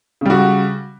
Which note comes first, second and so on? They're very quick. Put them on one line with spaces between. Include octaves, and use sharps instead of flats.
C#3 G3 F#4